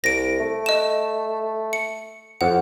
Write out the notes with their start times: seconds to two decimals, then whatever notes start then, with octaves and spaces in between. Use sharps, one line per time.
0.04 C2 A#6 D7
0.39 A3
0.66 D#5 E7
1.73 C#7
2.41 F2 F#5